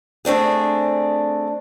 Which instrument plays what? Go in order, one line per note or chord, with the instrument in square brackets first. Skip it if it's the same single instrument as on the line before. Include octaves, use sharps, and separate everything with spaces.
[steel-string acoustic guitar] A3 C4 D4 G#4